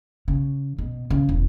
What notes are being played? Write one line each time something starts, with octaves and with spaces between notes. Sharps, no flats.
C#3
B2
C#3
E1